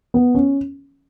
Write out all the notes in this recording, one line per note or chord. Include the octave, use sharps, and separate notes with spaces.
B3
C#4